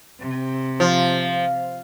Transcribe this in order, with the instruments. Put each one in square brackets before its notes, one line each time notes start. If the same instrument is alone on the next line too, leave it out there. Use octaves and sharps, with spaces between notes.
[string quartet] C3
[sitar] F3